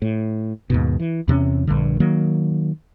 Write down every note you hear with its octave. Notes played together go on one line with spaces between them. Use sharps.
A2
D#2 G#2 B2
E3
E2 C3 G#3 C#4
A#1 G2 D3
D#3 F#3 A#3